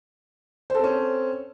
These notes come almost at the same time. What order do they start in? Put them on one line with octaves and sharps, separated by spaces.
C5 A4 C4 C#4